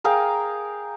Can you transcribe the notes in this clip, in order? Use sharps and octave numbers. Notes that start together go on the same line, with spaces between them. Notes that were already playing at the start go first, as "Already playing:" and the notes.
G#4 A#4 F5 G5